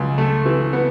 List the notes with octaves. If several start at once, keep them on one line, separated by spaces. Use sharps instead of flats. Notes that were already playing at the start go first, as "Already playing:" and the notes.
Already playing: C#2 F#3
A3
E3
B3